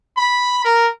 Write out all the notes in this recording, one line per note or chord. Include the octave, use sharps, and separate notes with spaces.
B5
A#4